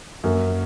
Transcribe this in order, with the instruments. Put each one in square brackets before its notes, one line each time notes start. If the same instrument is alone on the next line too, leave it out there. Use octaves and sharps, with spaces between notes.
[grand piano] F#2 [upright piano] A#3